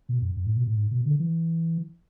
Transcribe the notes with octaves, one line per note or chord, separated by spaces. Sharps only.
B2
F#2
F#2
A2
B2
A2
G#2
B2
D3
E3